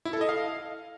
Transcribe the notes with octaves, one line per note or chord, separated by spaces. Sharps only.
E4
A4
D#5
F5